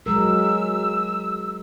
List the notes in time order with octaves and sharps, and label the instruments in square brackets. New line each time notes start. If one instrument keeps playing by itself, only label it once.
[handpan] F#3 G#3 A#4 [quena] E6